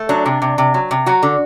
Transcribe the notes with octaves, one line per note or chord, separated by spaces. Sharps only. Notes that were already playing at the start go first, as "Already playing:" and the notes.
Already playing: A3
F#3 D4
C3
C3
C3
F#3
C3
F#3 F#4
D3